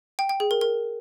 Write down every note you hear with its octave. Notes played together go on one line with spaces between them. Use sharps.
G5
G5
G#4
A#4
A#4